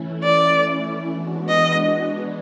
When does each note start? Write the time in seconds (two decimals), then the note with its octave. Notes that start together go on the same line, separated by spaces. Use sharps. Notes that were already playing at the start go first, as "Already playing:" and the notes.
Already playing: E3 A3 C#4 E4
0.23 D5
1.06 E3 G#3 B3 D4 F#4
1.48 D#5